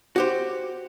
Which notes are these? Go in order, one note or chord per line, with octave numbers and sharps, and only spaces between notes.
F#4 G4 C5